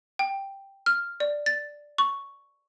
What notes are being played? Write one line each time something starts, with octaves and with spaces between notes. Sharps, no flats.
G5
F6
D5
A6
C#6